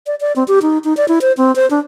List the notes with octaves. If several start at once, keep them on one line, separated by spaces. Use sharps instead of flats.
D5
D5
C4
G4
D#4
D#4
D5
E4
C5
C4
C5
D4